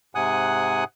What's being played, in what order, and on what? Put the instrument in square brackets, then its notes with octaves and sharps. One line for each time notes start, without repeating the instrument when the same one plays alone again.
[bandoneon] G#2 C3 F#5 G#5 D#6 F#6